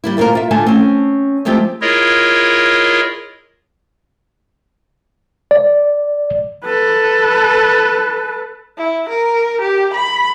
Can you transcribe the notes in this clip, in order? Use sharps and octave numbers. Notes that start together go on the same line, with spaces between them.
G3 A#3 E4
D2 A#2 A#3 F4 A#4
F4 E5
D3 A3 F4 G#5 A5
C4 C#4
F3 G#3 A3 C4 F4 G4
E4 F4 G#4 A#4 C#5 D#5
D5
A4 B4
E4
A#4
G4
B5